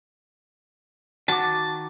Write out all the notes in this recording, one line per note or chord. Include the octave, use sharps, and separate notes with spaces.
D#3 F#4 A5 D6